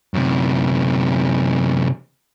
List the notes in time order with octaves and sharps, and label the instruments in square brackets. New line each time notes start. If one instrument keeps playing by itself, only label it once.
[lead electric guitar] F#2 C3